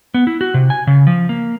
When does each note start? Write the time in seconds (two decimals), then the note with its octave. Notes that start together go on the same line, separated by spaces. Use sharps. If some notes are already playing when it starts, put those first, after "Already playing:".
0.14 B3
0.27 E4
0.41 F#4
0.54 C3
0.70 G#5
0.87 C#3
1.07 F3
1.29 A#3